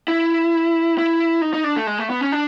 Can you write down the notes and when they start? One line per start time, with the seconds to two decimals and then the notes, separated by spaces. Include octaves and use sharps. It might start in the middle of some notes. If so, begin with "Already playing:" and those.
0.08 E4
0.98 E4
1.42 D#4
1.54 D#4
1.64 D4
1.76 A3
1.87 G#3
1.98 A3
2.10 B3
2.21 C#4
2.32 D4